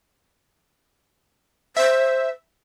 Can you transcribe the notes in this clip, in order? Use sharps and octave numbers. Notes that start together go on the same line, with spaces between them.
C5 E5